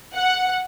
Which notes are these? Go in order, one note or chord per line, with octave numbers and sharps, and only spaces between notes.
F#5